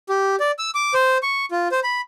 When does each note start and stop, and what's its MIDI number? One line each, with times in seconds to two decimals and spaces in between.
0.09 0.36 67
0.40 0.52 74
0.59 0.71 88
0.75 0.94 86
0.94 1.18 72
1.23 1.46 85
1.51 1.68 65
1.72 1.80 72
1.84 2.01 83